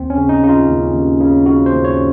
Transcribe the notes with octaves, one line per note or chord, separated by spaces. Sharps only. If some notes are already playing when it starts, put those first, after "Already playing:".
Already playing: D#2 C4
C#4
C#3
D#4
C#3 D#4
F4
D#2
D#2
C#3
C#3 F#4
C5
D#2
C#5